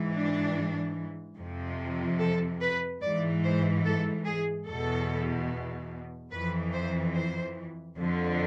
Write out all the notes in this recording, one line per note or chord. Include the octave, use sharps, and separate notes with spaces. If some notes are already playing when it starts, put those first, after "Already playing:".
Already playing: G#2 E3
D4
F2 C3 F3
A4
B4
G#2 E3 D5
C5
A4
G#4
E2 B2 A4
F2 E3 B4
C5
C5
F2 D3 F3